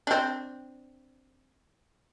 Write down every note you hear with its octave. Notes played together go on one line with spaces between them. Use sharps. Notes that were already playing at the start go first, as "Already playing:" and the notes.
C4 D4